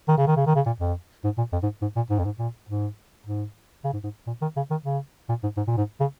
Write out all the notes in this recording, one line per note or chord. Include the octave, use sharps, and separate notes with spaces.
D#3
C#3
D#3
C#3
D#3
C#3
A#2
F2
G#2
A#2
F2
G#2
G#2
A#2
G#2
F2
G#2
A#2
G#2
G#2
C#3
G#2
G#2
A#2
D#3
C#3
D#3
C#3
A#2
G#2
G#2
A#2
G#2
C#3